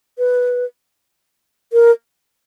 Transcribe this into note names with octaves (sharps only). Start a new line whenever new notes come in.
B4
A#4